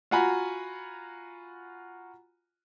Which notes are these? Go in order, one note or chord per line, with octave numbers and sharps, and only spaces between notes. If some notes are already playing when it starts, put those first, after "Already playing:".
F4 F#4 F#5 G#5 A#5 B5